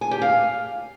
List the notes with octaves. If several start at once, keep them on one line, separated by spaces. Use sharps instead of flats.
G#5
G4
F5